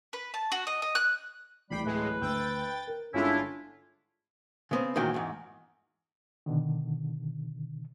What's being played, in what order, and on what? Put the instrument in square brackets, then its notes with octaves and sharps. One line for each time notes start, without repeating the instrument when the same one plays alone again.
[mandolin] B4
A5
F#4
D#5
D#5
F#6
[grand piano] D1 E3 C7 [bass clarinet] G3 [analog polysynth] G5 B5
[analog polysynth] A2 G#3 [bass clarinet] B4
[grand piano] D2 E6 [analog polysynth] G5 A6
[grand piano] A#4
[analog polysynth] G1 F4 [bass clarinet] D3 [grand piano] G#3 [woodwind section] C#4 D4 E4
[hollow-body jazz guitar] C#3 B3 C4
E2 A#2 D#3 F#3 G5
E2 G#2
[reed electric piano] B2 D3 D#3